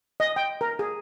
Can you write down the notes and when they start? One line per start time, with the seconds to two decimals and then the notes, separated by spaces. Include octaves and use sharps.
0.20 D#5
0.36 G5
0.61 A#4
0.79 G#4